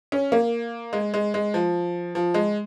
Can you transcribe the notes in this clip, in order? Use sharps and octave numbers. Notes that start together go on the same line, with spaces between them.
C#4
A#3
G#3
G#3
G#3
F3
F3
G#3